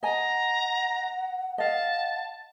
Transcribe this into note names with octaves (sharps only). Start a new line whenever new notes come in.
D#5 F#5 G#5 A#5
D#5 F5 A5